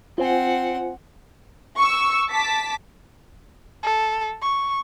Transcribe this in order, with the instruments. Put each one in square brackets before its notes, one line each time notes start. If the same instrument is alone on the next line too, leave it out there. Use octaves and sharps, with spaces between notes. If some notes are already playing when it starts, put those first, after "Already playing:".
[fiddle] C4 F#5 [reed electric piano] F4 C5 G#5
[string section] C#6 E6
A5 D6 B6
[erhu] A4
C#6